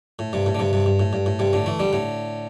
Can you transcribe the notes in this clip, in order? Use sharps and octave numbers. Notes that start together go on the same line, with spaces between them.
A2
G2 C3
A2
D3
G2 C3
G2 C3
G2
A2
G2
A2
G2 C3
A2 D3
E3 A3
D3 G3
A2 D3